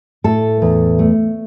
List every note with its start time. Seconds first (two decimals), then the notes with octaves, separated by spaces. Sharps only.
0.24 A2 A4
0.62 E2
0.99 A3